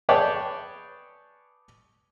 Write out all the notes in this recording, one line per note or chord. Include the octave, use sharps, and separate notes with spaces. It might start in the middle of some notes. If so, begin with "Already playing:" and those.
G#4 B4 C#5 D5 G5 A5